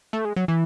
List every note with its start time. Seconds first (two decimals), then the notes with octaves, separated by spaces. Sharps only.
0.13 A3
0.25 G#3
0.36 F#3
0.48 E3